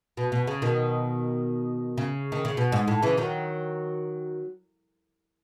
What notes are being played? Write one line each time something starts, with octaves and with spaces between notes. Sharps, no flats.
B2
B2
C#3
B2 D#3
C#3
D#3
C#3
B2
G#2
A2
C#3 E3
D#3 F#3